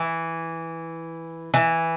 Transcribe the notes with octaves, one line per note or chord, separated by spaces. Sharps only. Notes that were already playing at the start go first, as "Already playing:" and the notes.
Already playing: E3
E3